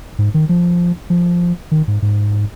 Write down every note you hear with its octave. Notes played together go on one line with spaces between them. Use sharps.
G#2
D#3
F3
F3
D#3
G#2
G#2